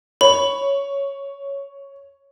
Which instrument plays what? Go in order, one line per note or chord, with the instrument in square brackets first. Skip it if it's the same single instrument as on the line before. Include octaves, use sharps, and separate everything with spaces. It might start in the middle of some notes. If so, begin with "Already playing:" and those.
[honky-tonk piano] C#5 [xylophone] B5